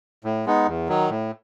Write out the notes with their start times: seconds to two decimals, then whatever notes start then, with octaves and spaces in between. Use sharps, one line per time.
0.24 A2
0.46 G#3 B3 D#4
0.67 E2
0.89 D#3 F#3
1.10 A2